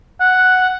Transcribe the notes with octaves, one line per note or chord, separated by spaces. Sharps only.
F#5